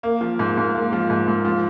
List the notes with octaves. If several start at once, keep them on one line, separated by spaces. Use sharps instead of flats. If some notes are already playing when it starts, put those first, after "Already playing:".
A#3
F3
G#2
G#2
A#3
F3
G#2
G#2
F3